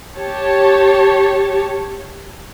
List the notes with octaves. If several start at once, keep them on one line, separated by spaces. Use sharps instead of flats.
G4 C#5 A5